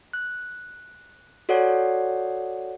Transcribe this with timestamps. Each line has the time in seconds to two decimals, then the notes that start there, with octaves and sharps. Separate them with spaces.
0.13 F#6
1.49 F#4 A4 C#5 D5 F#5